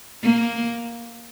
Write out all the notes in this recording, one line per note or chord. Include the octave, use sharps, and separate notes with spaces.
A#3